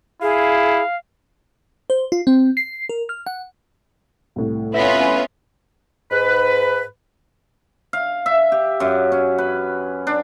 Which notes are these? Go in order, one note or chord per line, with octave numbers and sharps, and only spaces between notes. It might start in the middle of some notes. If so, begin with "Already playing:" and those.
E4 G#4 F5
C5
F4
C4
C7
A#4
F6
F#5
C2 A2
B3 C#4 F4 B4 E5 A#6 B6
G#2 B4
F5
E5
G4
F#2
C#4
B4
D4